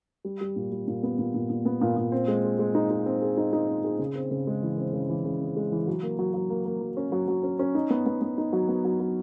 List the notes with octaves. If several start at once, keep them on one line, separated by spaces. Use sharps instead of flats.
G3
G3
A#2
G3
A#2
B3
A#2
A#2
A#2
B3
A#2
A#2
C4
G#3
G#4
G#3
D#4
D#4
C4
G#4
D#4
D#4
C4
G#4
C#3
C4
C#3
G#3
E3
C4
C#3
E3
C#3
C4
G#3
E3
F#3
A#3
F#3
F#3
A#3
A#3
F#3
C#4
F#3
F#3
C#4
C#4
D#4
B3
B3
B3
D#4
F#3
B3
F#3
F#3